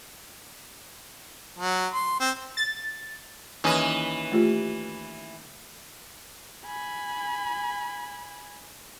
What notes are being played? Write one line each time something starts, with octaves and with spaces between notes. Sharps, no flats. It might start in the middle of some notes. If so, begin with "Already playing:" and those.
F#3
C6
C4
A6
D#2 E3 C#4 B4 D#5
A3 F4 G4
G#5 B5